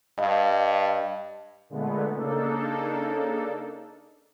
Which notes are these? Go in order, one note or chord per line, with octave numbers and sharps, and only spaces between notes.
G2 D#5 F5
A#2 D3 G#3 A3 B3
C#3 A#3 D4 D#4 A4